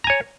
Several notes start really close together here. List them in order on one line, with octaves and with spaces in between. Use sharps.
A#5 G#5 C#5